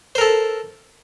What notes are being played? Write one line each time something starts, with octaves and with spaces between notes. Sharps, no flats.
A4 A#4 C5